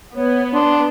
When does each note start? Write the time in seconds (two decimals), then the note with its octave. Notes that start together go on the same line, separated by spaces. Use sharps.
0.16 B3 C#5
0.54 D4 C6